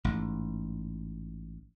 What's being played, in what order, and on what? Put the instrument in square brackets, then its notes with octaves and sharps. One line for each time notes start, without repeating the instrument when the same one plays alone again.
[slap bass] A1 G#2